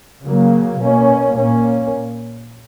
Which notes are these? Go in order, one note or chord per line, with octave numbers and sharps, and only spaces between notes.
C#3 F#3 A#3
B2 A#3 C#4
A#2 A#3 C#4